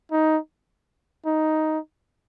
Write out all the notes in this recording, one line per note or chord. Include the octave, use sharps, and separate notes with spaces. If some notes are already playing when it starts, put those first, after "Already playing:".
D#4
D#4